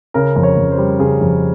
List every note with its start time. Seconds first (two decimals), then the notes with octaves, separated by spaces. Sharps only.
0.14 C#3 A#4
0.36 F2
0.43 C#5
0.57 F2
0.72 C5
0.78 G3
0.99 C#3 G#4
1.21 F2